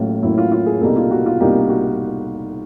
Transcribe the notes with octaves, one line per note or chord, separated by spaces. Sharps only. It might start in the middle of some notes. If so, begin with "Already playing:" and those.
Already playing: A1 A2 F#3 A#3 F4
A1 A2 F#3 A#3 E4
F4
F4
G#4
C2 B2 G3 A#3 D#4 A4
F4
F#4
F4
C2 B2 G3 A#3 D#4 G4
F#4